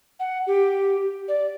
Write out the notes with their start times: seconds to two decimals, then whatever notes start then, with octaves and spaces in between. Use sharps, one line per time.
0.20 F#5
0.47 G4
1.28 D5